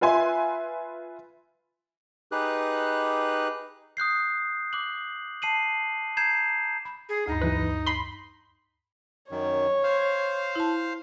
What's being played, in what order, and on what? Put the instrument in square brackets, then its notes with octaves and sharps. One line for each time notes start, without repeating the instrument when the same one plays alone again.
[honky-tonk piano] F4 B4 E5 G#5 C6
[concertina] D#4 G4 G#4 B4 F#6
[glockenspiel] D#6 F#6 G6 C7
D6 F#6 F#7
A5 C7 D#7 F#7
A#5 G6 G#6 C7 E7
[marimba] B5
[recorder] G#4
[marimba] D2 G2 [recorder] D#4
[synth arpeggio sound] B1 E3 B4
B5 C6
[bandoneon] F#2 D#3 [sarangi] C#5
[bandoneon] C5 F5
[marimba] E4 A5